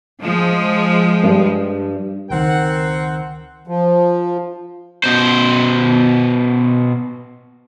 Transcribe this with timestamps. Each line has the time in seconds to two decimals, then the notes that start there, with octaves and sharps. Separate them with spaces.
0.20 F3 G#3
1.23 G2
2.30 C#2 D#3 C4 A#4 F#5
3.67 F3
5.04 B2 C5